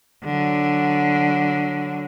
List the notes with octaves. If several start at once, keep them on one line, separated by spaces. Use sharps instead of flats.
D3 F#3